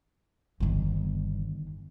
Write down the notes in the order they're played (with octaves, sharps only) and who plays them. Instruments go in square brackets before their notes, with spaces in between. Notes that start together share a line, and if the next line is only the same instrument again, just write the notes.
[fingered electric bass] G1 [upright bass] E2 D#3